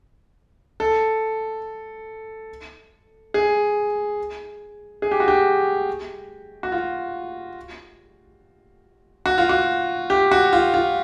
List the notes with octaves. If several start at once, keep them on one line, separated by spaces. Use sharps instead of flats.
A4
G#4
G#4
G4
F#4
G4
F#4
F4
F#4
F4
F#4
G4
F#4
F4
F4